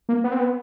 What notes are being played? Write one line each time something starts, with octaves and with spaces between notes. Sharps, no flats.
A#3
B3
C4
B3